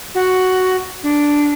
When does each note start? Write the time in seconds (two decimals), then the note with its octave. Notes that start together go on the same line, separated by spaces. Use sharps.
0.15 F#4
1.03 D4